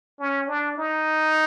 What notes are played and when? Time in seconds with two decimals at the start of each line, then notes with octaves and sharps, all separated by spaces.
0.19 C#4
0.48 D4
0.78 D#4